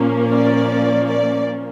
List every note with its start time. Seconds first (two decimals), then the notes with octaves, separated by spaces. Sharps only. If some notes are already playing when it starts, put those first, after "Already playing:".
Already playing: A#2 F3 A#3 C#4
0.31 D5
1.07 D5